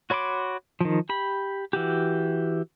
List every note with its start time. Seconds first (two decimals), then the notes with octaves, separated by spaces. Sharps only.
0.10 F#4 C#5 B5 C6 D6
0.81 D#3 F3
1.09 G4 B5
1.73 E3 F#4 G4